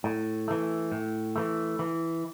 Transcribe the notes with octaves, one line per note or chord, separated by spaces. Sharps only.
A2
E3 A3
A2
E3 A3
E3